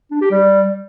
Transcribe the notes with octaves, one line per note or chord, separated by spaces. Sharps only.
D4
G4
G3